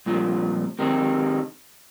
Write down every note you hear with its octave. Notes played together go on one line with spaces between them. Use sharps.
C2 A#2 F3
C3 D#3 C4 D#4